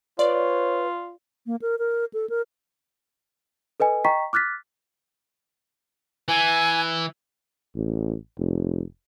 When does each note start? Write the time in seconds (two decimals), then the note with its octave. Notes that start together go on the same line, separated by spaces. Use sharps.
0.19 F4 B4 C#5 D5
1.46 A#3
1.62 A#4
1.79 A#4
2.14 A4
2.30 A#4
3.80 A4 B4 D#5 G#5
4.05 D#5 G5 A#5 C#6 B6
4.33 D6 F6 F#6 A6 B6
6.28 E3 G#5
7.76 A1
8.38 F1